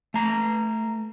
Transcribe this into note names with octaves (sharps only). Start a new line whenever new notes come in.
A3 A#5